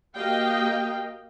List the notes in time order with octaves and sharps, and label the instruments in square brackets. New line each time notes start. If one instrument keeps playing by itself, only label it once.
[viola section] A#3 F#4 G4 D#5 F5 G5